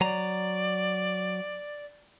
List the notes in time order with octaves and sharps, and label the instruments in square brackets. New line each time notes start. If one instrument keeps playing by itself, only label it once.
[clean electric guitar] F#3 A#5 [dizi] D5